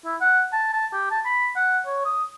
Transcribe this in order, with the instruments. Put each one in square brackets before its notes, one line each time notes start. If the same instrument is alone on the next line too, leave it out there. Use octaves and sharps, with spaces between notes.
[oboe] E4
F#5
A5
A5
G4
A5
B5
F#5
C#5
D#6